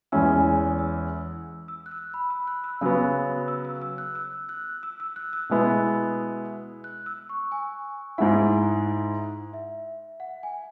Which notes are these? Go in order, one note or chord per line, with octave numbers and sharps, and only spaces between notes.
E2 E3 G#3 C#4 E4 E6
E6
E6
F#6
E6
B5
E6
F#6
E6
C#3 F#3 B3 F#6
E6
E6
E6
F#6
E6
F#6
E6
E6
F#6
E6
B2 G#3 B3 E4
F#6
E6
C#6
G#5
G#2 G#3 E4 F#5
E5
F#5
G#5